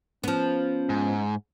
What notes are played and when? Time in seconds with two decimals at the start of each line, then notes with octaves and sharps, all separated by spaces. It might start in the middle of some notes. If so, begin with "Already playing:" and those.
0.24 F3 B3 C#4
0.89 G#2